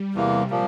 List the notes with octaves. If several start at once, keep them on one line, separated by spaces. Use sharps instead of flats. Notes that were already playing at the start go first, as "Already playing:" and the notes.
Already playing: G3
E2 C3 E3 A#3
A#2 F3 A#3